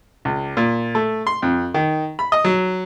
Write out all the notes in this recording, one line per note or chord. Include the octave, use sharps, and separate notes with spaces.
C#2
A#2
A3
C6
F2
D#3
B5
D#5
F#3